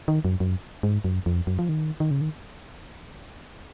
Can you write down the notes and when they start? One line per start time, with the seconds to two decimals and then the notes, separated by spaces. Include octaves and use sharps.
0.08 D#3
0.25 F#2
0.40 F#2
0.83 G#2
1.04 F#2
1.26 F2
1.47 F#2
1.59 F3
1.69 D#3
2.00 D#3
2.11 C#3
2.21 D#3